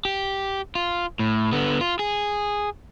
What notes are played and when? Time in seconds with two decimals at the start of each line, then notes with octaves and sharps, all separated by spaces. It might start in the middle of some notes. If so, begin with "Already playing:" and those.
0.05 G4
0.75 F4
1.19 A2
1.52 D3 B3
1.81 F4
1.99 G#4